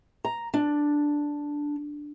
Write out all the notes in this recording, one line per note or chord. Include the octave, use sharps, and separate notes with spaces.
A#5
D4